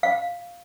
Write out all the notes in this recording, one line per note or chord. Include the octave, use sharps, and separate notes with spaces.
F5